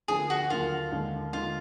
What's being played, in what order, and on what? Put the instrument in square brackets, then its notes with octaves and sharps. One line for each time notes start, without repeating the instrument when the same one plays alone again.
[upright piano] D2 D3 F3 A#3 D4 [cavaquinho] G#4
[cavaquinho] F#4
[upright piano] D#2 D3 F#3 A#3 [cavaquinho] F4
[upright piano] D#2 D3 G#3
[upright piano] D3 G#3 D#4 [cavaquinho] F4